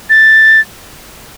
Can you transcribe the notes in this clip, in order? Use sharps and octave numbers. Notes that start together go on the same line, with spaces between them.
A6